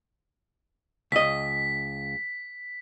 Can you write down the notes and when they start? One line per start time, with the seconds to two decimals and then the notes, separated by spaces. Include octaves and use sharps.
1.12 C#2 D#5 B6